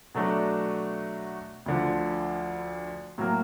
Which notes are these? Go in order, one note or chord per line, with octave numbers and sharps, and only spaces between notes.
B2 F#3 A3 D4 F#4
D2 D3 F3
A2 F#3 A#3